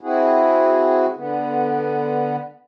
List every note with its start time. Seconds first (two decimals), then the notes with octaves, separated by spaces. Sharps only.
0.01 C4 E4 F#4 G#4
1.17 D3 B3